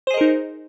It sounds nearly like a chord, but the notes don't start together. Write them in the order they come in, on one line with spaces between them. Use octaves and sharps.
C5 G#4 D#5 A#4 D#4